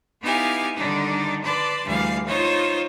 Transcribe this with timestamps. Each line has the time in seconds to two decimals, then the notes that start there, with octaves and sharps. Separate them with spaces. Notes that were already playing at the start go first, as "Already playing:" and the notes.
0.21 B3 D#4 E4 G4 F5 G#5
0.75 D3 D#3 G3 D4 D#4
1.45 B4 D5 A5 C6
1.85 D2 E3 G3 G#4 F5
2.26 D#4 F4 C5 C#5